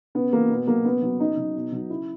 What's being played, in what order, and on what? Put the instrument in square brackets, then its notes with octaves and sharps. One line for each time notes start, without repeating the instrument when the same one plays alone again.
[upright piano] C#3 B3
E3 A#3
B2 B3
F#3 A#3
C#3 B3
F#3
C#3 D#4
F#3
B2
F#3
C#3 E4